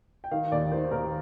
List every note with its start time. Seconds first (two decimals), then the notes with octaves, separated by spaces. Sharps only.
0.24 G5
0.31 D#3 F5
0.52 D#2 D5
0.72 D#3 C5
0.92 D#2 A#4